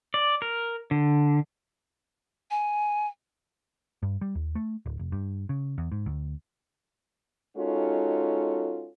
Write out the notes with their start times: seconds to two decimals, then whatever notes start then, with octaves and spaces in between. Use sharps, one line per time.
0.14 D5
0.42 A#4
0.91 D3
2.51 G#5
4.03 G2
4.21 G3
4.35 D#2
4.55 A3
4.86 D1
4.99 F1
5.12 G2
5.49 C#3
5.78 E2
5.92 G#2
6.06 D2
7.57 G#3 C#4 D#4 F4 F#4 A4